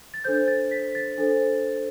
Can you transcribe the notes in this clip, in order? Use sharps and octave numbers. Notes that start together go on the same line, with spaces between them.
A6
D4 A4 C5 G6
A6
B6
A6
D4 A4 C5